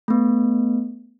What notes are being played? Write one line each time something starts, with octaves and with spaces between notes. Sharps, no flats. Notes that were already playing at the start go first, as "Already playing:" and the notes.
A3 B3